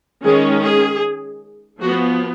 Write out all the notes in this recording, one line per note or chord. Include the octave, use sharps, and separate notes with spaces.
D#3 G#3 C#4 G#4
G#4
F3 B3 F#4